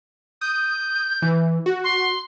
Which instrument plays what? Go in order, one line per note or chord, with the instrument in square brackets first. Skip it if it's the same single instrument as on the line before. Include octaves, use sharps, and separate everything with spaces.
[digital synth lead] D#6 [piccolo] G6
[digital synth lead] E3
F#4
[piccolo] C6